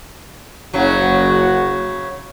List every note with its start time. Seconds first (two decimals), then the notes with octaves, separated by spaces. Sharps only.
0.73 F#1 C#3 F#3 F#4